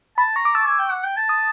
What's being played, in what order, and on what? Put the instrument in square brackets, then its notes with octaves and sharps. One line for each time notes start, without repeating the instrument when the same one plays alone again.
[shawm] A5 [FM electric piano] B5
[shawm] A#5 [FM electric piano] C#6
[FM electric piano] D6
[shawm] A5 [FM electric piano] E6
[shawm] G#5
G5
F#5
G5
A5
[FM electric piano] D#6